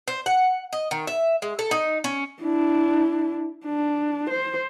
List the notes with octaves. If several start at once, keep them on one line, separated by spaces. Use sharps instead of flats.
C5
F#5
D#5
D#3
E5
G#3
A4
D#4
C#4
D4 E4
D4
C5